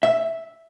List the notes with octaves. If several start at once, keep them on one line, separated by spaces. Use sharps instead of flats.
E5